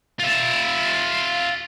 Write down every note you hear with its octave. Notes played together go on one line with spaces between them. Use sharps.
F4 E5